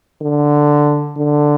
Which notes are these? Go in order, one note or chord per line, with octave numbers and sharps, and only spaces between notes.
D3
D3